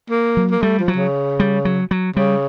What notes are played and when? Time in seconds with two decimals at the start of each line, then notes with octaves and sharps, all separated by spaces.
0.11 A#3
0.37 F#3
0.52 A#3
0.63 G3 A3
0.80 F3
0.88 F#3
0.97 C#3
1.40 G3
1.65 F#3
1.91 F#3
2.17 C#3 G3